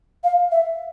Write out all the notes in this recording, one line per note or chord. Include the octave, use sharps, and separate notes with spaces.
F5
E5